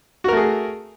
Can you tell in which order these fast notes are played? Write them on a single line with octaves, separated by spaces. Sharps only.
F#4 A#4 A3 G#4